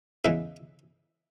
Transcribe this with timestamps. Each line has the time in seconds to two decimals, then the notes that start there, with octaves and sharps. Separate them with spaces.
0.25 E2 C#3 E3 G#3 E5